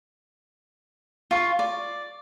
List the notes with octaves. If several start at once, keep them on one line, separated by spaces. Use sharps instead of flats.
F4 C#6
D5